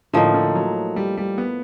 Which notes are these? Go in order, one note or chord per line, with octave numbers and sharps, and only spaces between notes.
A2 D3 F3 A#3 D#4
D3
F#3
G3
G3
B3